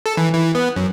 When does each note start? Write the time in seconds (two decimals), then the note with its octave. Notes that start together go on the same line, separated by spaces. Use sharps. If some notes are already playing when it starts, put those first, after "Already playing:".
0.06 A4
0.17 E3
0.33 E3
0.55 B3
0.76 F#2